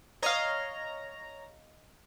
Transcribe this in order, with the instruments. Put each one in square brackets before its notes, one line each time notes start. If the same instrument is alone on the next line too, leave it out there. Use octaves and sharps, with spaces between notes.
[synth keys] C#5 A#5 [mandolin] D#5 F5